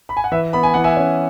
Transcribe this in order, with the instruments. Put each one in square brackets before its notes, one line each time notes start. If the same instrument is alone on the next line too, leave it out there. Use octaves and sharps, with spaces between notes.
[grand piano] B5
G#5
F#5
E3 B4 E5
B3 B5
G#5
E3 F#5
E5 G#5
C#4